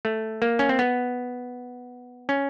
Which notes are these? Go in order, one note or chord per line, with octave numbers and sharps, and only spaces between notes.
A3
A#3
C#4
C4
B3
C#4